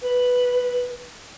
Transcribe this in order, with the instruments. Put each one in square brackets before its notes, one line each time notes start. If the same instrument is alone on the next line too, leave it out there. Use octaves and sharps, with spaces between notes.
[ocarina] B4